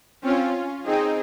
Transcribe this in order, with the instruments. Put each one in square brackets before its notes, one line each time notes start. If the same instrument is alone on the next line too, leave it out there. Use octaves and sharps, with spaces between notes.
[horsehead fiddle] C4 [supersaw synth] C#4 F4
[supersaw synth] C4 D#4 [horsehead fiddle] G#4